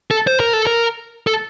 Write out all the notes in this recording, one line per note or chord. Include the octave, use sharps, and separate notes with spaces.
A4
C5
A#4
A4
A#4
A4